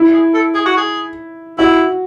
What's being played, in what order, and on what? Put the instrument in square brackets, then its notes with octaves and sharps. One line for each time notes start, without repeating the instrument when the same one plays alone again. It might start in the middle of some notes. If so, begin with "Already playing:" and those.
Already playing: [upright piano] E4
[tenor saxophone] G#4
A4
G#4
F#4
G#4
[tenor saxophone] E4 [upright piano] F#4